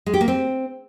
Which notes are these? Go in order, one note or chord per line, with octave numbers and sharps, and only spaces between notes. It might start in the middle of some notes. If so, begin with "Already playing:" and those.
G#3
G4
A#3
C4